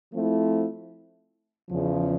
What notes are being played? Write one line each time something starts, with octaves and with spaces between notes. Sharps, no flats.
F3 A3 C4 E4
E2 C#3 F3